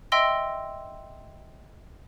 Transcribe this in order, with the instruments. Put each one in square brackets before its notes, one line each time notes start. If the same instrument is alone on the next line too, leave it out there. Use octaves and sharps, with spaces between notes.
[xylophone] D#5 E5 G5 C6 E6 A#6